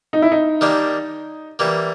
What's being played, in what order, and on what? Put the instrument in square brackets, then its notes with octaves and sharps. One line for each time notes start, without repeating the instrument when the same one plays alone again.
[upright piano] D#4
E4
D#4
[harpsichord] D#3 G3 A#3 D4
E3 G3 A#3